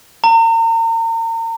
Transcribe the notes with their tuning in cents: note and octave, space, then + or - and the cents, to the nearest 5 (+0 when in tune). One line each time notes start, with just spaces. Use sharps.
A#5 -40